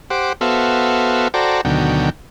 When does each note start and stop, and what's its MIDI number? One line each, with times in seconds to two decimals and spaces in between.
0.10 0.33 67
0.10 0.33 72
0.10 0.33 78
0.10 0.33 86
0.41 1.28 59
0.41 1.28 66
0.41 1.28 69
0.41 1.28 72
0.41 1.28 76
0.41 1.28 77
1.34 1.61 66
1.34 1.61 69
1.34 1.61 72
1.34 1.61 74
1.34 1.61 79
1.34 1.61 82
1.65 2.10 38
1.65 2.10 47
1.65 2.10 50
1.65 2.10 51
1.65 2.10 54
1.65 2.10 79